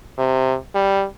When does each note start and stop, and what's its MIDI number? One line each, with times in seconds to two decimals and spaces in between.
0.18 0.56 48
0.75 1.05 55